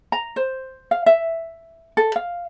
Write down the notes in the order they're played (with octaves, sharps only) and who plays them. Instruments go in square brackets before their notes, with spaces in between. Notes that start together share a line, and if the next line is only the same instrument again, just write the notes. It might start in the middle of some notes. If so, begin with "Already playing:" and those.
[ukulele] A#5
C5
F5
E5
A4
F5